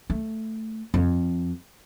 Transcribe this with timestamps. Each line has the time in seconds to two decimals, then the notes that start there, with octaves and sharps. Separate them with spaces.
0.10 A3
0.94 F2